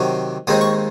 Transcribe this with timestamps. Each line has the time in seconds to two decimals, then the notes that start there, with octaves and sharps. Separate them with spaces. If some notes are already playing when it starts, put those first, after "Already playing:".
Already playing: C3 D#3 F#3
0.47 D#2 D#3 G#3 C4 D#4 D#6
0.61 C#6